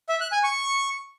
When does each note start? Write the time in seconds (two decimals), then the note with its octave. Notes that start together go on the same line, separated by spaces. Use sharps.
0.09 E5
0.21 F#6
0.32 G#5
0.44 C#6